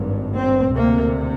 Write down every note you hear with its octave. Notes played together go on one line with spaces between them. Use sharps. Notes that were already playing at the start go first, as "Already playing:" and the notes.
Already playing: G#1 G2
C4
D2 C3 A#3